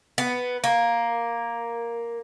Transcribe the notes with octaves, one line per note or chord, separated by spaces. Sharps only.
B3
A#3